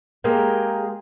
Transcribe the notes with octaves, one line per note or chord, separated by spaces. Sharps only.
G#3 A#3 G4 G#4 A#4 G5